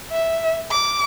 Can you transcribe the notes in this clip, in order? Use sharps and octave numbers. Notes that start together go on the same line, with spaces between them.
E5
D6